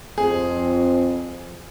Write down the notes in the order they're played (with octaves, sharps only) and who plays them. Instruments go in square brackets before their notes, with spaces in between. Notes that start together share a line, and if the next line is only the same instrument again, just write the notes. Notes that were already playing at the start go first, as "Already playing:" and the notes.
[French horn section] F2 [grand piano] G#4